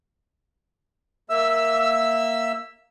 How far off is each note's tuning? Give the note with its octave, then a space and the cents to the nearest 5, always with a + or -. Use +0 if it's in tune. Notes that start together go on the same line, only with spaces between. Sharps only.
A#3 -5 E5 -5 E6 +15